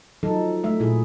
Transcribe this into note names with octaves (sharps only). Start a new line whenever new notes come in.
F3 F#3 D#4 A4
F3 A3 E5
A#2 E4 G#4